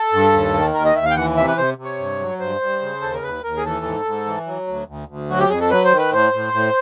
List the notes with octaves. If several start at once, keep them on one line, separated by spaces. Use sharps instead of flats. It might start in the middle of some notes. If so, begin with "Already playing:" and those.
Already playing: A4
G2
D#2
D#3
D#2 A#4
D#5
D#2 E5
F5
G5
E3 F#5
C3 E5
B4
C3 C5
C3
C#5
G2
F#3
G2 C5
G2
C#3
D#2 A4
A#4
D#2 B4
D#2 A#4
G#4
E3 A4
G#2
G#2
E3
F#3
D2
D2
D2
F#3 F#4
G4
F2 G#4
A4
F#3 B4
C5
D#3
B4
A2 C5
A2
A2